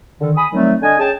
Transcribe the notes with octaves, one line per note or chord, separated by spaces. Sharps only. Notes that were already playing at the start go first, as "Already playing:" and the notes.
D3 D#3
G#5 B5 D#6
D#3 F#3 G3 A3 C4
D3 D4 D#5 G#5
C#4 G#4 G5 A5